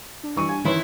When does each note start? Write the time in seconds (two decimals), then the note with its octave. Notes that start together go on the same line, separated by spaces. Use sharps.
0.23 D4
0.36 E3 G3 C#6 D#7
0.49 G#5
0.65 D#3 E3 C#4 E4 B4 C6